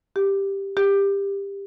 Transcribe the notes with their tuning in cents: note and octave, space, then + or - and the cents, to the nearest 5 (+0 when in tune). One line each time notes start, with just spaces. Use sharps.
G4 +5
G4 +20